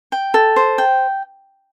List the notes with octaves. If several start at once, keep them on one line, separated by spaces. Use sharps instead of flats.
G5
A4
C5
G5